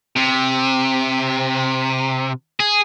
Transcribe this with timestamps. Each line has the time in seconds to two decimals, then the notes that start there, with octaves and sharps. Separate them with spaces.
0.16 C3
2.60 G#4